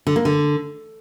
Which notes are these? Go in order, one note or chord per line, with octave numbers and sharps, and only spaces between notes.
D3
A#3
D3